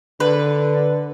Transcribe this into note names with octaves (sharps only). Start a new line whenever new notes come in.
D3 B4